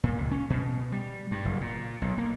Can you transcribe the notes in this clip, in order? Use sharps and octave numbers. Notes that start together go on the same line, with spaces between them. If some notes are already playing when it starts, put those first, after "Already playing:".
A#2
C#2
C#4
B2
G3
G2
F#1
A#2
B1
A#3